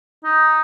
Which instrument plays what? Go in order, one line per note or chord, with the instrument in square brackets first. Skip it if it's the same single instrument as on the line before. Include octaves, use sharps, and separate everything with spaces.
[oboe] D#4